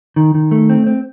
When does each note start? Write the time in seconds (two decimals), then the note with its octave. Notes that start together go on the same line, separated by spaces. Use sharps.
0.16 D#3
0.35 D#3
0.51 A3
0.69 C4
0.87 C4